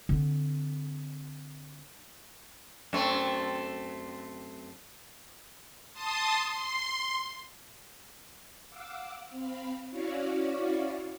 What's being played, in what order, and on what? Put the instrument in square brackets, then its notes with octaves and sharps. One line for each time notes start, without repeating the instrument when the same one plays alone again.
[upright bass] D3 C4
[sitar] F#2 A3 C4
[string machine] A5 C6 D#6
C6
F5 F#5 D6 E6
C4 F5 B5
C#4 E4 F#4 C#5 D5 F5